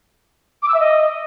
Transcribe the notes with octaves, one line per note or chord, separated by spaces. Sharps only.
D6
E6
E5
D#5